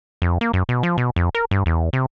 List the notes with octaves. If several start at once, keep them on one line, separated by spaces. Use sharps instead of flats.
F2
A#3
F#2
B2
F3
B2
F2
A#4
G2
E2
C3